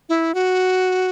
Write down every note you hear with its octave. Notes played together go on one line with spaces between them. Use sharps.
E4
F#4